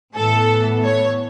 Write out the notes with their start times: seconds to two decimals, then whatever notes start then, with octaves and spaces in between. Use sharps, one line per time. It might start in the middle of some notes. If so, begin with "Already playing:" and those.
0.16 A2 E3 B3 A4
0.84 C#5